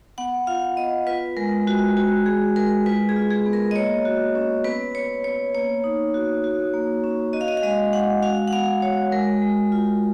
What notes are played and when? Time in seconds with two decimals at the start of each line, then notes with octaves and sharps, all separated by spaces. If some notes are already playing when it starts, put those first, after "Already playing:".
0.18 B3 F#5
0.47 F4 F5
0.77 B3 D#5
1.07 F4 B4
1.37 G#3 A#4
1.67 G#3 F#4
1.97 F#4
2.26 G#3 G#4
2.56 G#3 A#4
2.86 F4 B4
3.09 G#4
3.16 F4
3.30 G#4
3.46 B3
3.53 A#4
3.71 D#5
3.75 A#3 C#5
4.05 F#4
4.35 C#4
4.64 B3 B4
4.95 B3 C#5
5.24 B3 C#5
5.55 A#3 C#5
5.84 D#4
6.14 F#4
6.44 F#4
6.74 A#3
7.04 C#4
7.33 F#4 D#5
7.41 F5
7.48 D#5
7.57 F5
7.63 G#3 D#5
7.93 G#3 F#5
8.23 F#4 F5
8.48 F#5
8.53 B3 F5
8.82 F#4 C#5
9.12 G#3 A#4
9.42 G#3
9.72 F4